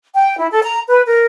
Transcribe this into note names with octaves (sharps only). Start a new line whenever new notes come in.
G5
E4
A4
A#5
B4
A#4